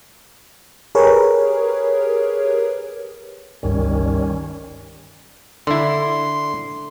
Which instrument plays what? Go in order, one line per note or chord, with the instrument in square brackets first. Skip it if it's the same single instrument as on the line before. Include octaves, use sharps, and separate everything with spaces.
[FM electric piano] G4 G#4 A#4 B4 C#5
[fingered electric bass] G1 C#2 G2 [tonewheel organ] D#3 G3 C#4
[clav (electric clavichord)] D3 E4 [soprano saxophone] C6